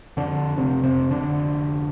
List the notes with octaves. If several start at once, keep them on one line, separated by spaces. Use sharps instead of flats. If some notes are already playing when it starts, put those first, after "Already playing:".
F2 D3 D4
F1 C3 C4
C3 C4
F1
D3 D4
F1